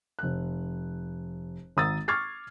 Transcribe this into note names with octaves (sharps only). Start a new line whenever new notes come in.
F1 F#6
G#1 A#5 D#6 E6 A6
C#6 D6 F6 G#6 A6 C7